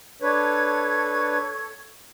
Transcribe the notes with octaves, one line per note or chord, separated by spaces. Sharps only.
D4 A4 B4 C#5 C#6 G#6